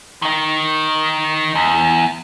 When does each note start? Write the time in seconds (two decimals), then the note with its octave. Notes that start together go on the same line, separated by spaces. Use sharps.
0.22 D#3 D#4
1.55 E2